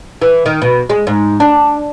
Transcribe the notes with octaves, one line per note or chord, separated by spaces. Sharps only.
E3
D#3
B2
G#3
G#2
D4